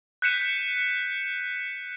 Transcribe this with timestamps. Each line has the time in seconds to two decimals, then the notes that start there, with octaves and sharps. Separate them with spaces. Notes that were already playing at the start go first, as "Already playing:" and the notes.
0.22 F#6 G6 B6 C#7 D#7 E7